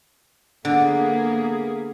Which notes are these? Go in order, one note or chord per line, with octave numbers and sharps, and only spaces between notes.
D3 A#3 B3 G#4